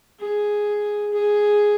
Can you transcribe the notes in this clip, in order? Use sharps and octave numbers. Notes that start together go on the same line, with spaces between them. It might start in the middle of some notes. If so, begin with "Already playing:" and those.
G#4
G#4